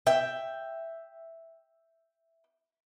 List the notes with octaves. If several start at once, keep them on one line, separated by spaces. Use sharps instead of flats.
E5 G5